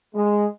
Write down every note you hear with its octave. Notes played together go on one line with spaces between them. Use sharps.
G#3